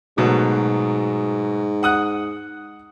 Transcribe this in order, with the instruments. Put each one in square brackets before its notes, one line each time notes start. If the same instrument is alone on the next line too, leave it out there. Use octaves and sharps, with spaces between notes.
[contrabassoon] G#2 [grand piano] B2 F#3 A3
[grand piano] F#5 D#6 F#6